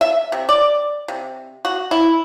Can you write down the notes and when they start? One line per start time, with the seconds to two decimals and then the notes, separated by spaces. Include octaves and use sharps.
0.01 E5
0.32 C3
0.49 D5
1.08 C3
1.65 F#4
1.91 E4